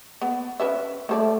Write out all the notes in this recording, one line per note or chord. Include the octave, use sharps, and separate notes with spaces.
B3
C#4 B4 E5
G3 A3 C5 D5